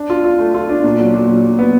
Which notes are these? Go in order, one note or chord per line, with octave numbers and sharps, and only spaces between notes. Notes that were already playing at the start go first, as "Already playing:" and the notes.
Already playing: D4
F4
F4
A3
F4
D4
A#2
F#3
A#2
F#3
F#3
B3